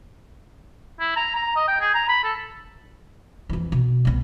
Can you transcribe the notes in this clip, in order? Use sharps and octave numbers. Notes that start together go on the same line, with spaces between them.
E4
A#5
A#5
D#5
G5
G#4
A#5
B5
A4
F2 E3
B2
C2 B3